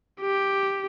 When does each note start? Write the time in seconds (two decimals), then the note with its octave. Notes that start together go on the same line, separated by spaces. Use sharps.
0.21 G4